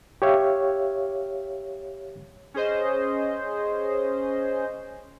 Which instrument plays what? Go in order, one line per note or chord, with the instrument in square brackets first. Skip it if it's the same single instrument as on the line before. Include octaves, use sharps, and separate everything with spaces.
[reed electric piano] G4 C#5 E5 F5
[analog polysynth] C#4 G#4 C5 D#5